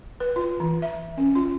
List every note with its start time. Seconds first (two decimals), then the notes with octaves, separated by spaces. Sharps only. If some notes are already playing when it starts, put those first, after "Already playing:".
0.20 B4
0.36 F4
0.60 E3
0.82 E5
1.17 C#4
1.35 F4